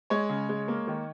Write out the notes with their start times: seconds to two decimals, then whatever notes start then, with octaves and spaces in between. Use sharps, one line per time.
0.10 G#3 C#5
0.29 C#3
0.49 G#3
0.68 A#3
0.87 D#3